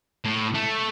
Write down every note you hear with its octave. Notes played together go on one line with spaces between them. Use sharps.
A2
A3